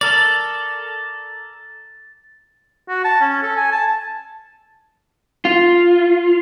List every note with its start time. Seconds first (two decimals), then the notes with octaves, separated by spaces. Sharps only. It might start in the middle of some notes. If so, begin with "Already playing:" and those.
0.01 A4 A#4 D5 A6
2.89 F#4
3.05 A5
3.21 C#4
3.42 A4
3.57 G#5
3.72 A5
5.45 F4